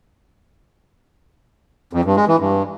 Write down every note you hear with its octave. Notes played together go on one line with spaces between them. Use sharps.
F2
G2
G#3
E3
G2